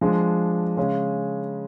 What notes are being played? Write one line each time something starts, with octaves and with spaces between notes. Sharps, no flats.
F3 G#3 D4
C#3 G#3 C#4